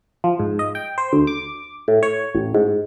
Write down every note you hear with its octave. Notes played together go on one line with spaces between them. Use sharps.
F3
G#2
D#5
G5
C5
D2
D6
A2
C#5
A1
G#2